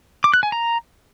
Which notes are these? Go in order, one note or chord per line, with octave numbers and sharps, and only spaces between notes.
D6
F#6
G#5
A#5